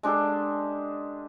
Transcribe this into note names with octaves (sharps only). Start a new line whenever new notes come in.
G#3 D4 G4 A4